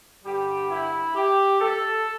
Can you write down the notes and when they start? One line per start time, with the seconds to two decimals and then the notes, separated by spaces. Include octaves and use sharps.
0.24 G2 D3 G3 G4
0.70 E4
1.15 G4
1.60 A4